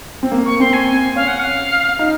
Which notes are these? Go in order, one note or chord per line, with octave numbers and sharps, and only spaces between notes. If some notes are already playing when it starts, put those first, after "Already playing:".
C4
A#3
C#6
C4 C6
G#5
G#5
C#4 F5
F#5
F5
D#4